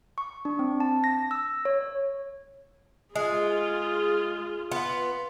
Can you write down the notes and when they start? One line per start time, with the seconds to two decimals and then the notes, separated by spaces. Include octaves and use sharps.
0.18 C#6
0.45 D4
0.59 C4
0.80 A5
1.04 A#6
1.31 E6
1.65 C#5
3.16 G#3 F4 G#4
4.72 B3 F4